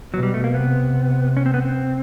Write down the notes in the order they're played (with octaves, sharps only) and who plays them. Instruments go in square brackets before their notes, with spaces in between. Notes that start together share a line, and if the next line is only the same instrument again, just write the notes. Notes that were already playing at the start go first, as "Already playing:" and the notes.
[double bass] B2 [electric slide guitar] F#3
[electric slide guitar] G3
A3
A#3
[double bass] C3 [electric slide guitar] B3
[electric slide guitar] C#4
C4
B3
C4